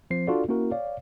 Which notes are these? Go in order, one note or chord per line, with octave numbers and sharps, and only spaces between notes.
F3 C4 C5 C7
D4 F4 F#4 A4 D5
A#3 C#4 E4 F#4 A#4
C#5 D5 F5